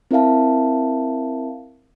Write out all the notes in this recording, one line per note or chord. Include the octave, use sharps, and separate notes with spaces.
C4 E4 A#4 E5 F5 A5